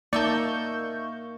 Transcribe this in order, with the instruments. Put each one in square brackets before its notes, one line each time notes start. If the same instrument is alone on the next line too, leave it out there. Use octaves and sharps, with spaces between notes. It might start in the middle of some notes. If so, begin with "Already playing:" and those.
[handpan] A#3 [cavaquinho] D#4 E5 A5 [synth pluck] D5 [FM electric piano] C#6 G6